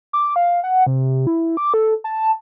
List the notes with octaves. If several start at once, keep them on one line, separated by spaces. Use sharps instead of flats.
D6
F5
F#5
C3
E4
D6
A4
A5